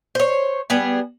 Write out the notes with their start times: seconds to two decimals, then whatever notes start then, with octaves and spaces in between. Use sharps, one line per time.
0.15 C5 C#5
0.70 G3 B3 G#4